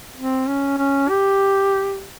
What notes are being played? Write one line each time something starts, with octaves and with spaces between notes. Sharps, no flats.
C4
C#4
C#4
G4